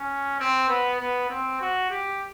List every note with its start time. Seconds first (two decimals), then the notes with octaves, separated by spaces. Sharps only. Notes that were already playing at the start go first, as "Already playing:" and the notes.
Already playing: C#4
0.39 C4
0.68 B3
1.00 B3
1.29 C4
1.61 F#4
1.90 G4